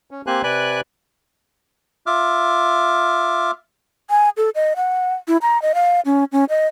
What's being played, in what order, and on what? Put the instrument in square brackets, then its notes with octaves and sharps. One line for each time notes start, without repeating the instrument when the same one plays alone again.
[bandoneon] C#4
A#3 C4 G4 C5 G#5 F#6
C3 B4 D5 G#5 B5 F#6
[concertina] F4 E5 D6 F6
[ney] G#5
A4
D#5
F#5
E4
A#5
D#5
F5
C#4
C#4
D#5